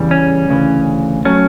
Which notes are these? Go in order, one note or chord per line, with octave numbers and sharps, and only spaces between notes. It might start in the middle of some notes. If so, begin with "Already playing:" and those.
Already playing: E2 C#3 E3 G3
C#4
D2 C#3 E3
F#3 A3 C#4